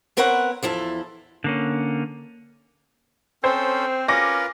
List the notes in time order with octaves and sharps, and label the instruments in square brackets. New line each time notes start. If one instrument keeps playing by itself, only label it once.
[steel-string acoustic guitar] B3 C4 A#4 B4 C#5 F#5
E2 F3 E4 A4
[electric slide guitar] D3 A#3 C#4
[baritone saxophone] C4 [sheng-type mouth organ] C#4 A4 [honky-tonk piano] C5
[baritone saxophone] C#4 [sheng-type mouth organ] F4 A#4 B4 [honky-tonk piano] D6 A#6